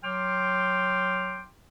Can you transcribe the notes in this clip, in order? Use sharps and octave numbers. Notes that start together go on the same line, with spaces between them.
F#3 G5 C6 D6 F6